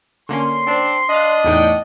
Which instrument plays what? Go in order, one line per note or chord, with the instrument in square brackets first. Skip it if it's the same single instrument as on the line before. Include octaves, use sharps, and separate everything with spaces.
[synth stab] D3 A#3 C#4 [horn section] C6
[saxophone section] C4 D4
[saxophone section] D4 D5 D#5 [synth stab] F5 F#6
[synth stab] E2 A2 D#4 [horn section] F#5 G5